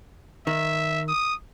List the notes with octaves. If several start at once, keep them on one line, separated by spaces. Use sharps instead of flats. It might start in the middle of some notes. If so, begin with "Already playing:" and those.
D#3 E5
D#6